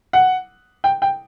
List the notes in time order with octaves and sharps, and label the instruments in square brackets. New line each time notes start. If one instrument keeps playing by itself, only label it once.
[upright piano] F#5
G5
G5